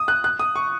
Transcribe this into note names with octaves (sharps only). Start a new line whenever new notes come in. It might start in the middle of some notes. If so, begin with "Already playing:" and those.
Already playing: D#6
F#6
F#6
D#6
C#6